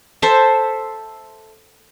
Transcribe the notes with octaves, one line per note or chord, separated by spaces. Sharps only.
A4 C5 E5 A5